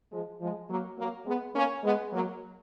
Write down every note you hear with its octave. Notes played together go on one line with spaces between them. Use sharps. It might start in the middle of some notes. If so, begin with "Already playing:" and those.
F3 G#3
F3 G#3
F#3 A#3
F#3 A#3
G#3 B3
A#3 C#4
G#3 B3
F#3 A#3